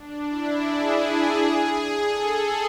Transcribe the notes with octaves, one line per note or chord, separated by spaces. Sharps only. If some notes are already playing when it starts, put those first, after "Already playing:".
Already playing: D4
E4
G#4
A4